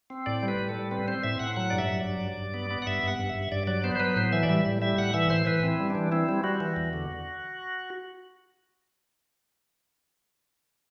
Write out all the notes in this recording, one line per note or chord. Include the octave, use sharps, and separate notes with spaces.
C4
A2 D5
G3
B4
A2
A4
G3
C4 B4
C4 C5
A2 E5
A2 F#5
F#3 F#5
G2 D5
E5
F#3
G2 D5
G2
G2
B3
B3
F#5
G2 E5
G2 F#5
G2
E5
G2
G2 D5
F#3 D5
B3 C5
C5
F#3 B4
A2 C5
E3 E5
D5
G3 E5
A2
G3 E5
A2 F#5
E3 E5
A2 C5
E3 B4
C4 E4
G3
E3 D4
C4 E4
G3
G3 F#4
E3
E2
D3